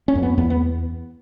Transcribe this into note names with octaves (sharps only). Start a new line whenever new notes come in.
C#4
F2
B3
E2 B3
B3